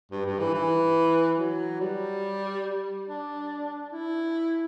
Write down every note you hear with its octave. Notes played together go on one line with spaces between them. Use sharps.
G2
G2
E3
E3
F#3
G3
D4
E4